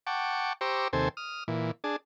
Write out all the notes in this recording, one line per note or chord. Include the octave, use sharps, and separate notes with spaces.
F#5 G5 A5 C#6 D6
G4 C5 A#5 C#6 D6 E6
D#2 C3 A4 C5 G#5
D#6 F6
A#2 E3
D4 G#4 A5